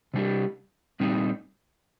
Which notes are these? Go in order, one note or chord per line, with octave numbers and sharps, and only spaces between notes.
C3 G3 D4 G4
A#2 G3 C4 D#4